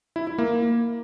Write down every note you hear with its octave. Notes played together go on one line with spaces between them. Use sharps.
E4
E4
A#3